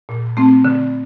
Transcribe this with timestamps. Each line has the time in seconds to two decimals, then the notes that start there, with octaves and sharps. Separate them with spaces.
0.09 A#2
0.37 A3 C4
0.65 D3